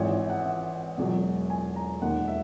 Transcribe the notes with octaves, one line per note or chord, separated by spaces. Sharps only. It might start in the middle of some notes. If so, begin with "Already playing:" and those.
Already playing: G#1 G#2 E3 C#5
E5
F#5
E5
E1 E2 B2 F#3
G#5
A#5
E1 D#2 D#3 F#5
E5